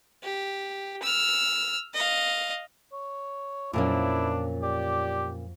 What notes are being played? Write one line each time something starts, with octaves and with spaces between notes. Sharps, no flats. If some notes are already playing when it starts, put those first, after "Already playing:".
G4
E6 F6
D#5 F5
C#5
F2 A#2 F#3 A#3 C#4 D4 E4 F5
G4 D5